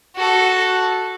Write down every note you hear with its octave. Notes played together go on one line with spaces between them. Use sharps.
F#4 A4